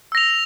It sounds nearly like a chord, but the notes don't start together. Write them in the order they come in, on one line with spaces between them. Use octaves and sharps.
E6 A#6 F7